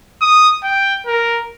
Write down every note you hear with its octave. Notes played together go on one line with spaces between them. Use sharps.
D#6
G5
A#4